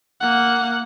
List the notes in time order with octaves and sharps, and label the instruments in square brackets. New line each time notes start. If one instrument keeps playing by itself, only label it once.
[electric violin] A#3 F#5